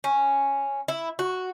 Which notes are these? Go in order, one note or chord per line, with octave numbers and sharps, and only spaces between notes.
C#4
E4
F#4